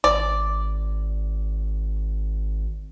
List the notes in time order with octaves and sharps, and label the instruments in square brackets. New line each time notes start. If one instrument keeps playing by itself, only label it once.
[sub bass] G#1 [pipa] D5